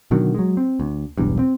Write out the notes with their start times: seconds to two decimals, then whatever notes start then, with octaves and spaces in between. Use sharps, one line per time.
0.11 B2 D3 D#3 F#3
0.34 F#3 G#3
0.57 C4
0.80 D2
1.18 E1 B1 E2 G2
1.39 C4